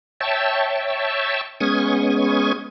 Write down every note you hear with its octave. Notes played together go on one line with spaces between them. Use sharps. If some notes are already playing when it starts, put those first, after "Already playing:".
C#5 E5 G5 A5
G#3 B3 C#4 C#6 D#6 G#6